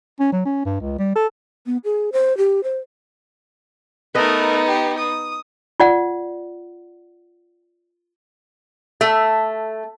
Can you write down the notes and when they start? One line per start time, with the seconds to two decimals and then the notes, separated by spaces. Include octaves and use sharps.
0.20 C#4
0.32 F#3
0.45 C#4
0.65 G2
0.81 C#2
0.98 G3
1.15 A4
1.66 B3
1.84 G#4
2.13 C5
2.38 G4
2.64 C5
4.15 A3 B3 D#4 A#4 B4 D#5
4.67 G4
4.98 D#6
5.80 F4 D5 F#5
9.01 A3